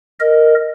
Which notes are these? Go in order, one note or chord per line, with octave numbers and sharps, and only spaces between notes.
A#4 D#5